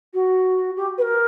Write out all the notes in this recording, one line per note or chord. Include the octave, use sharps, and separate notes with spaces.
F#4
G4
B4
A#4